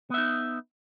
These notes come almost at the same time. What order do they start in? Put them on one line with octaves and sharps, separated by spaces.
B3 E5 D#4